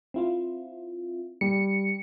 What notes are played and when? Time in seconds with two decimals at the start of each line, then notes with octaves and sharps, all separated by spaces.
0.14 C4 E4 F4
1.41 G3 C#7